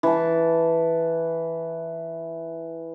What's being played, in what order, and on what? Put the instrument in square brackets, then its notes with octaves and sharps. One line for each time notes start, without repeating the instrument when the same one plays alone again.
[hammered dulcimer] E3 A5